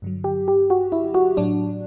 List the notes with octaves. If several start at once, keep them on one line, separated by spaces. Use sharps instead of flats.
G2 D3 F#3
G4
G4
F#4
E4
F#4
A2 F#3 D4